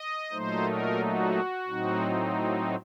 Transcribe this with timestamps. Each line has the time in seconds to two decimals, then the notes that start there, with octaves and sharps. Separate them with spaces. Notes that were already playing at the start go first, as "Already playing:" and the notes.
Already playing: D#5
0.31 A#2 F#3 A3 D#4 C5
0.65 A#4
1.00 F#4
1.67 A2 F#3 C4 D#4